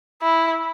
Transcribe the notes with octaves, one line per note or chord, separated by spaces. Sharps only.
E4